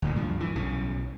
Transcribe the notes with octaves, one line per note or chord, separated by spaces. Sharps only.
D2 A#2 D3
G2 F3
E3
B1 C#3